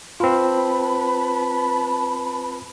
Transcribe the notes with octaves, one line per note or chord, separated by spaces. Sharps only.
C4 F4 B4 A5 B5